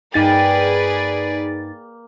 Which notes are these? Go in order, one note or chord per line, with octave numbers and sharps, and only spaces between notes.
G2 A#3 D#4 G#4 B4 D5 G5 A6